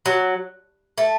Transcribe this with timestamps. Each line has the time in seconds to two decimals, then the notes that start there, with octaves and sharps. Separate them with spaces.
0.06 F#3
0.98 A3